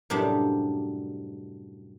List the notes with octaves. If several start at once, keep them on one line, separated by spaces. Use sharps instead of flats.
F#2 A2 C3 G3 D4 D#4